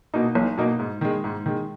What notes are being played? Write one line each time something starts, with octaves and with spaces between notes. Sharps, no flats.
B2 A#3 D#4
B1
B2 A#3 D#4
G#2
D#3 G#3
G#2
D#3 G#3